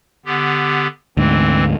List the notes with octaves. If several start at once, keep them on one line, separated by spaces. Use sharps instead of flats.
D3 B3 G4
D2 G#2 E3 C4